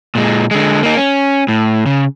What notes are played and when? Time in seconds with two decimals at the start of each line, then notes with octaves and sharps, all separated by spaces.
0.15 A#2 G#3
0.51 D3 G#3
0.83 A#3 D#4
0.97 C#4
1.48 A2
1.86 C#3